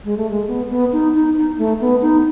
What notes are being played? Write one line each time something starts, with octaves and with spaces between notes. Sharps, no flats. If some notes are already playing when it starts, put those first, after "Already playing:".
G#3
A3
G#3
B3
B3
D#4
D#4
D#4
A3
B3
D#4